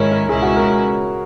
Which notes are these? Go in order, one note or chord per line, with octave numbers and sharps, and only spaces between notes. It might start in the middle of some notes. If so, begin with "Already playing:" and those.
Already playing: G#2 D#3 G#3 C#4 E4 A#4 C#5
A#4
C#2 B2 G#3 C#4 E4 G#4
F#4
A#4